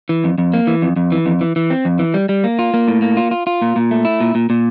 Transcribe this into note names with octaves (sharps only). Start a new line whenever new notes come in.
E3
F2
F2
A#3
E3
F2
F2
E3
F2
E3
E3
C4
F2
E3
G3
G3
A#3
F4
A#3
A2
A#3
F4
F4
F4
A#2
A#2
A3
E4
A#2
A#2
A#2